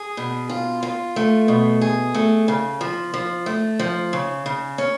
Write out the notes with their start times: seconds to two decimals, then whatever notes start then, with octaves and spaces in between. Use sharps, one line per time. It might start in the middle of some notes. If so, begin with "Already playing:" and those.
Already playing: G#4
0.17 B2
0.50 F4
0.83 F4
1.16 A3
1.48 B2
1.81 G#4
2.15 A3
2.48 C#3
2.81 F3
3.14 F3
3.46 A3
3.80 F3
4.13 C#3
4.46 C#3
4.78 C#4